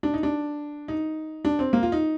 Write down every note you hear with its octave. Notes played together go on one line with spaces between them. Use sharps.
D4
D#4
D4
D#4
D4
C4
A#3
F4
D#4